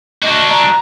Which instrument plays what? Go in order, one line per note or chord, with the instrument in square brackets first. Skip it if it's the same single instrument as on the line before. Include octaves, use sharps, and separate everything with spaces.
[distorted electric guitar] D4 F#4 [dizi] D#5
[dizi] A#5